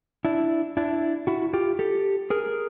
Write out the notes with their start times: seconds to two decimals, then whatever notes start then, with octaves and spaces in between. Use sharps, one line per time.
0.25 D4 E4
0.77 D4 E4
1.27 E4 F#4
1.53 F4 G4
1.79 G4 A4
2.30 G#4 A#4